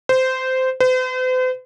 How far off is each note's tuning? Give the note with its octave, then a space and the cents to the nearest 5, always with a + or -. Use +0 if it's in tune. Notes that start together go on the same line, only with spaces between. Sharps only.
C5 -15
C5 -45